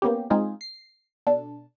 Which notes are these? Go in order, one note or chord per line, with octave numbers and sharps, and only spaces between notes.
A#3 B3 C#4 G4
G#3 C4 D#4 F4 G#4
C7
B2 D4 A4